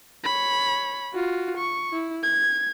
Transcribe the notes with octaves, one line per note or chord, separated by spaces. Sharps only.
C#5 B5
F4 F#4
C#6
E4
G#6